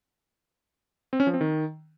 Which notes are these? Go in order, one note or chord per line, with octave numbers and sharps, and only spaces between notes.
C4
C#4
F3
C4
D#3